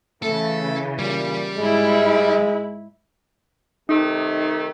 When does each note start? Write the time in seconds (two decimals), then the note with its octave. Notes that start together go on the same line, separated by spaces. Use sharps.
0.22 C#3 E3 A3 A4
0.99 A#2 G3
1.57 G#2 G#3 E4
3.89 C3 D#3 A3 D#4